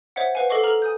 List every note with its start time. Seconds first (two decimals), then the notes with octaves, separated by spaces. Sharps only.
0.16 C5 C#5 D#5 E5 F#5
0.35 B4 C5 F5 F#5 G#5
0.50 A4 D#5 F#5 C#6 D6 C7
0.63 A4 A#5 C#6 F6 F#7
0.82 G#5 D#6 G6